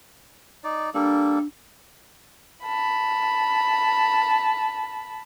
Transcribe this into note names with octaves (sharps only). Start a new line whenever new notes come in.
D#4 D5
G3 A#3 D4 A4
A5 B5